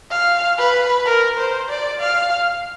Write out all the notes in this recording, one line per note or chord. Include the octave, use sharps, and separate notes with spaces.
F5
B4
A#4
C5
D5
F5